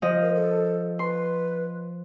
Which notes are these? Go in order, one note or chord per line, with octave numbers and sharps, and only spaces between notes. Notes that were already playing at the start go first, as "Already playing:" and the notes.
F3 D#5
A#4
A4
B4 C6